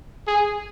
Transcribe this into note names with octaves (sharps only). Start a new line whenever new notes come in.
G#4